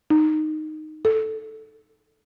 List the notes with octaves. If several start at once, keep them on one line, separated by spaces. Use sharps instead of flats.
D#4
A4